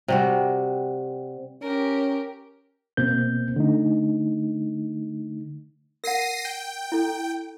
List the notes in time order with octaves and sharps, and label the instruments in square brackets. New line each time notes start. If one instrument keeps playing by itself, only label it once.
[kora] C3 G3 F#4
[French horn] C#4 [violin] G4 A#4
[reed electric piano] B2 A#3 C4 G6
D3 A3 D#4
[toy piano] A#4 F#5 [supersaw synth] A#6 C7 D#7
[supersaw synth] G5
[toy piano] E4 A4